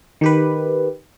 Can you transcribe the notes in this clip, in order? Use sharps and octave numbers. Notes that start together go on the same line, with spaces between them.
D#3 G4 B4